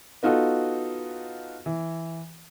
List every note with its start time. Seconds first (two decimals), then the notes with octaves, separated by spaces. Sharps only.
0.23 B3 D#4 F4 F#4 A4
1.66 E3